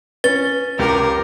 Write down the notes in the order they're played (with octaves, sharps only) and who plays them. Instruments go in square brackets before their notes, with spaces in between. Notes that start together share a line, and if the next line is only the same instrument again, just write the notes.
[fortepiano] C#4 [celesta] B4 [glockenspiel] A6 G7
[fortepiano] C#2 G4 [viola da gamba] A#4